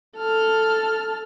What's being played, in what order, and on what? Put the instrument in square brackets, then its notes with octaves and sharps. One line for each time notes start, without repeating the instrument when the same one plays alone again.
[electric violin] A4 F6